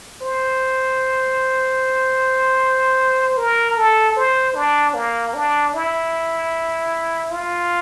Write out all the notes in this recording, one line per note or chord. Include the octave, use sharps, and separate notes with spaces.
C5
A#4
A4
C5
D4
A#3
D4
E4
F4